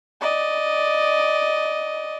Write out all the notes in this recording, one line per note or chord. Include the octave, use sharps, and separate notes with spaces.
D5 D#5